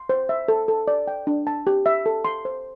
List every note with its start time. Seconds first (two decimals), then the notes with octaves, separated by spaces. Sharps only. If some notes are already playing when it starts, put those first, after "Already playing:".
Already playing: C6
0.09 C5
0.29 E5
0.48 A4
0.68 A4
0.88 D5
1.07 G5
1.27 D4
1.47 A5
1.67 G4
1.86 E5
2.06 A4
2.25 C6
2.45 C5